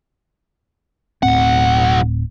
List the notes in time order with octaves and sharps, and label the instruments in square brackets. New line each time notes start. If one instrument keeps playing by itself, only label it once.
[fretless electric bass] D1 A2 C4 [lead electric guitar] B1 F#5